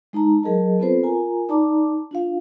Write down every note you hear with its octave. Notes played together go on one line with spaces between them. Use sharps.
G#3 D#4 A5 A#5
F#3 G#4 A#4 D#5 A5
B3 C4 F4 A4 B4 C5
F4 A#4 G#5 A#5
D#4 D5 A5 A#5 D6
D4 F4 F5